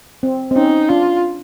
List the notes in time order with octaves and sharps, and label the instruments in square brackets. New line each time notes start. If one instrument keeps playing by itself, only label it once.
[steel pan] C4
C4
[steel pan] C#4 [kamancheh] D#4
[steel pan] D4 [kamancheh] F4